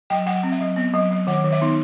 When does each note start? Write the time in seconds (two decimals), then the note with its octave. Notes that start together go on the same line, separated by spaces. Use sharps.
0.10 F#3 G5
0.26 F#3 F#5
0.43 C4
0.52 E5
0.61 F#3
0.76 B3
0.94 F#3
1.11 F#3
1.27 D#3 F#5
1.44 D#3
1.52 E5
1.61 B3 D#4